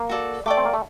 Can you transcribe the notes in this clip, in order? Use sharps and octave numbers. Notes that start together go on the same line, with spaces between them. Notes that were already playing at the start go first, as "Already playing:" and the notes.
Already playing: A#3
F#4 A4 D5
A3 D5 G5 D6
C4
A#3
A3